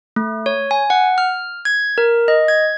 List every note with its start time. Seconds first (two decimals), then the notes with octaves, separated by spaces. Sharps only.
0.16 A3
0.46 C#5
0.71 G#5
0.90 F#5
1.18 F6
1.65 G#6
1.98 A#4
2.28 D#5
2.48 G#6